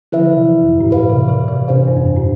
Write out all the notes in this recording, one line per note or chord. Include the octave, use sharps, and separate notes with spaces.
D3 F3 E4 B4 E5
C3 E3
F2
G2
A2
B2 G4 B4 F5
C3 E3
C3 E3
C3 E3
C3 D4 G4 C5 F5
G2
F2
G2
A2